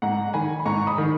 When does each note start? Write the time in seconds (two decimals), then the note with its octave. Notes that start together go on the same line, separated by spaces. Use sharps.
0.02 G#2 F#5 A#5
0.33 D#3 G#5 B5
0.59 B5
0.66 G#2 A#5 C#6
0.87 B5 D#6
0.98 D#3